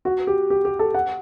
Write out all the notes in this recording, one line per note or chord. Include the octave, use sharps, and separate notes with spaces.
F#4
G4
G4
G4
A4
F#5